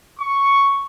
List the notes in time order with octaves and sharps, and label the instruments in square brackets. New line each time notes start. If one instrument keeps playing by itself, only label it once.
[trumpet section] C#6